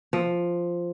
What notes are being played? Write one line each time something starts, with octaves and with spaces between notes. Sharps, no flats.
F3